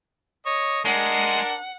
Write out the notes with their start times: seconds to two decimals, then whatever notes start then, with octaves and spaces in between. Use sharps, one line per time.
0.46 C#5 D#5
0.85 G#3 D4 A#4 F#5